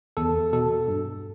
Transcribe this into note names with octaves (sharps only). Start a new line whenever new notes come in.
E2 A4
B2 A4
G2